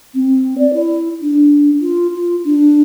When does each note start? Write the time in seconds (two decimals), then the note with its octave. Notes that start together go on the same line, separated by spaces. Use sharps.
0.14 C4
0.58 D5
0.73 E4
1.22 D4
1.81 F4
2.14 F4
2.45 D4